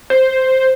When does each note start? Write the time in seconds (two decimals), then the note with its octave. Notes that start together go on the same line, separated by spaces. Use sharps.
0.10 C5